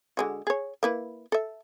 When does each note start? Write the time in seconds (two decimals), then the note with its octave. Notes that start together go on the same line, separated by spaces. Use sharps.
0.17 D3 G#3 F#4
0.47 G#4 C#5
0.83 A#3 E4 B4
1.32 A4 E5